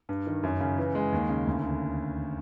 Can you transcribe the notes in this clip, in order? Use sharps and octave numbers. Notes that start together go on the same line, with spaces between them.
G2
D#3
F#2
C#3
E3
G#3
D#2
C#3
D2
D3